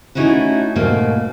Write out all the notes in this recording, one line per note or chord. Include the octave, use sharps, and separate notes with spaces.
A3 C#4 D#4 E4 F#4
G#2 B2 A3 A#3